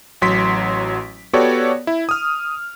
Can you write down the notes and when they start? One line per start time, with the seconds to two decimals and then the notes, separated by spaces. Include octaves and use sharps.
0.22 A1 F#3 C6 B6 D7
1.33 B3 F#4 G4 A4 C#5 D5
1.87 E4
2.09 D#6 F6